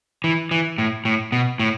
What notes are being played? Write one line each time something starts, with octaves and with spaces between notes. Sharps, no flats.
E3
E3
A2
A2
B2
A2